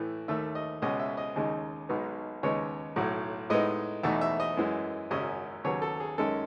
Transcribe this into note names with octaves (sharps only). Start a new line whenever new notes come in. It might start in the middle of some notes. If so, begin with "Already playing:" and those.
Already playing: A2 E3 A3
D#2 D#3 A3 E5
D#5
C#2 B2 G#3 C#4 D#5
E5
D#5
D#2 C#3 G#3 D#4
B1 B2 G#3 B3 D#4
D#2 C#3 G#3 B3 D#4 C#5
B1 A2 F#3
A2 G#3 B3 D#4 D#5
E2 B2 A3 D#4 E5
E5
D#5
F#2 E3 G#3
G#1 F#2 C#3 F#3 C#4 D#5
D#2 C#3 F#3 B3 C#5
A4
G#4
F#2 D#3 G#3 C#4 A4